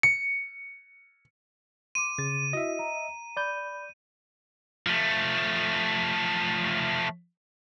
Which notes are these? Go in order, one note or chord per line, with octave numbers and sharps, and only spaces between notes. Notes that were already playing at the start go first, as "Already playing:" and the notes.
C#7
C6 D6 D#7
C#3 A6
E4 F#4 D#5 E5
A#5
D5 B5 G6
F3 A3